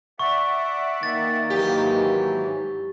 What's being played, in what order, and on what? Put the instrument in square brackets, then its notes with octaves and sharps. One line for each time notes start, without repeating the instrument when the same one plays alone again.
[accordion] D5 E5 F#5 [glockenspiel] C#6
[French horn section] D#3 A#3 [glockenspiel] A6
[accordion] G#2 E3 F#3 [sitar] G4